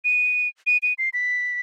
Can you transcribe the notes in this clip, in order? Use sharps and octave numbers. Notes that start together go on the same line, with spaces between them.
D#7
D#7
D#7
C7
B6